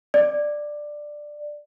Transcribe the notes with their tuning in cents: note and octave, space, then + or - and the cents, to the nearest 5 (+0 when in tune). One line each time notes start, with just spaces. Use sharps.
D5 +10